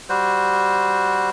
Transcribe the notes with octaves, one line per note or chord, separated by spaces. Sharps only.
G3 F#4 C5